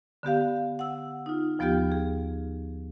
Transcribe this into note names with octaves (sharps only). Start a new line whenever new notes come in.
D3 B3 G4 F5
F#5 E6
D#4 F4
D#2 F3 B3 F4 G4 G5
G#4